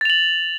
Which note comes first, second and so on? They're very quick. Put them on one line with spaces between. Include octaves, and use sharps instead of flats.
A6 F7 F#7